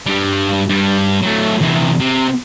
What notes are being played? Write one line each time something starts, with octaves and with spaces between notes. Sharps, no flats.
G2 G3
G2 G3
F#3 A3
E2 C3
C3